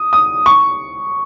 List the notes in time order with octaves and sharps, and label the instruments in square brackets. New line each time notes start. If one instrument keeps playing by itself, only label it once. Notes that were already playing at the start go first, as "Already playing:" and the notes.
Already playing: [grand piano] D#6
D#6
C#6